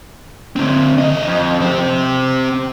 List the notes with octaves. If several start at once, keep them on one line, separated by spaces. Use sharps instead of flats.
D3 C4
E3 D#5
F2
C4 G4